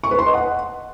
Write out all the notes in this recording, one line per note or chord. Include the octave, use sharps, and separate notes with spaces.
C#6
B4
C6
D#5
F#5